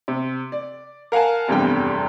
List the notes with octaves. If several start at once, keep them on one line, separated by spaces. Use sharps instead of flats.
C3
D5
A#4 F5 F#5 G#5 A5
F1 E2 G2 C3 G3 G5